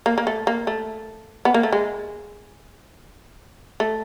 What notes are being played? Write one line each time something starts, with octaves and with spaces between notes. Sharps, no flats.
A#3
A#3
A3
A#3
A3
B3
A#3
A3
G#3
A3